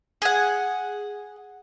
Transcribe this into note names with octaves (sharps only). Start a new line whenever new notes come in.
G#4 F#5